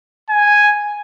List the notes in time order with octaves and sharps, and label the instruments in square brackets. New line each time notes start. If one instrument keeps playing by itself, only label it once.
[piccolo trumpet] G#5